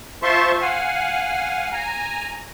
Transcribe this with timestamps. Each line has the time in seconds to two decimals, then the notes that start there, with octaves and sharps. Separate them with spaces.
0.23 F4 C5 E5 A5 C6 C#6
0.61 F5 F#5 G#5
1.72 G#5 A#5